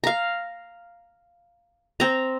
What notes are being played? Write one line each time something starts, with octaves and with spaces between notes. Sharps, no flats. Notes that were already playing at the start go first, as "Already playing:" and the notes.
F5 A#5
C4 A#5